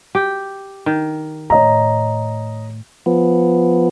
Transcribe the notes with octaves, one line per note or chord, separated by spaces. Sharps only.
G4
D#3
A2 C#5 D#5 A#5
F3 B3